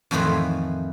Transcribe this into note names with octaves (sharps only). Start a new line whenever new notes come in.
F2 A2 D#3 E3 B4 C5